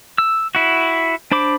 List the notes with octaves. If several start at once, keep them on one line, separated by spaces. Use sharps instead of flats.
E6
E4 F#4
D4 C5 B5 D6